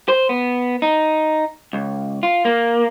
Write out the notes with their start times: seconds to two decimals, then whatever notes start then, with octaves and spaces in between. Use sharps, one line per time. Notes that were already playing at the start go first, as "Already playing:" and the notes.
0.08 C5
0.29 B3
0.82 D#4
1.73 C#2
2.23 F4
2.45 A#3